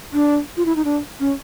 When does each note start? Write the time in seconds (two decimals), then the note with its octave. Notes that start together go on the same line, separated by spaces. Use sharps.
0.14 D4
0.57 F4
0.65 E4
0.76 D#4
0.85 D4
1.20 C#4